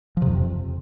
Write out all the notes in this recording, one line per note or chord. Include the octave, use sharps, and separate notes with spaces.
F3
C3
F2